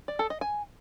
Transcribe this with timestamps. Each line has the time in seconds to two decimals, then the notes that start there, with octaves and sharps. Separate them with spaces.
0.08 D5
0.19 A4
0.30 D#5
0.41 G#5